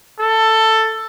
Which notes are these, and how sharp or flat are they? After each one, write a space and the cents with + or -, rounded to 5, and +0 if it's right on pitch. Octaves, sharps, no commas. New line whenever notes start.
A4 +10